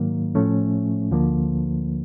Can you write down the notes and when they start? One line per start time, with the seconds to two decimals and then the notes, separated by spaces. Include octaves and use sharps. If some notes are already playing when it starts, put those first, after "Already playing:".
Already playing: G#2 D#3 F#3 A#3
0.35 A2 F3 A3 C#4
1.11 D2 D3 F3 A#3